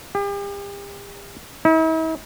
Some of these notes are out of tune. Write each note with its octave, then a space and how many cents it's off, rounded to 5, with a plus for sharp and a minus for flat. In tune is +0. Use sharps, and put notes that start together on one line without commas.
G4 +40
E4 -45